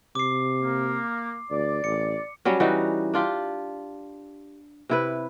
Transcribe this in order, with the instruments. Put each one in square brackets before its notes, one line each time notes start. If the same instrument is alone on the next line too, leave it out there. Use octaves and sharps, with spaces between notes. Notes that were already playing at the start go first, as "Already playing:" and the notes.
[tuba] C3 [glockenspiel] D6 C7
[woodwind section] A#3
[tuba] D2 [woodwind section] D5
[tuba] A1 [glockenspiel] C#7
[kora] F#3 G3 C#4
E3 G3 D#4 F#4
D4 F4 G4
C3 E4 B4